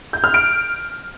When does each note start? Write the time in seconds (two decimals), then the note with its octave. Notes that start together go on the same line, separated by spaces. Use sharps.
0.13 G6
0.24 F6
0.34 D7